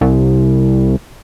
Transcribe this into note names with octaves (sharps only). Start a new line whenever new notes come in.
C2